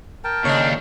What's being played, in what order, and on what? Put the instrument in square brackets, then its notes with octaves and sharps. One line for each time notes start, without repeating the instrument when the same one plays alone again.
[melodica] A#4 G5 A5
[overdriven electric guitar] D#2 D4 [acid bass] C#3 [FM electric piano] C#5 D#5